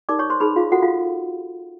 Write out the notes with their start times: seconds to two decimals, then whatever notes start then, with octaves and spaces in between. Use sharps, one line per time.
0.09 D#4 G4 A#4 D5 D6
0.19 C#5 C#6
0.30 C5 C6
0.40 D#4 G#4 B4 C5 B5
0.56 F4 F5
0.72 F4 F#4 A4 C5 F#5
0.82 F4 F5